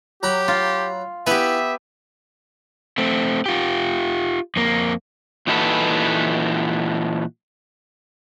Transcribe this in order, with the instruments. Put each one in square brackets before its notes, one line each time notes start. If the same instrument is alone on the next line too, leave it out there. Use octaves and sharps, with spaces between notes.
[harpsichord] F#3 A#5 B5 [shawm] G4
[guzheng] F4
[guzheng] B3 G4 [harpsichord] E4 B4 G#5 [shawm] E5
[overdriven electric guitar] A3 C4
F4 G4
F2 A#3
[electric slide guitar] A#2 E3 D#4 F#4 A4 B4